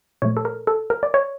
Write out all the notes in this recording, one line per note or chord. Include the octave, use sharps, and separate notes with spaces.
A#2 F3 A3 C#5
A4
A#4
A4
A#4
D5
C#5